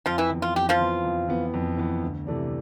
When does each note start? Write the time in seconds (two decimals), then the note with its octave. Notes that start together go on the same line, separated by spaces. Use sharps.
0.06 F2 F3 F4
0.18 E3 E4
0.30 E3 B3
0.42 F4
0.55 F2 G4
0.69 F3 F4
0.79 E3 B3
1.05 F2
1.28 E3 B3
1.54 F2
1.77 E3 B3
2.02 D2
2.27 C3 E3 A3 D4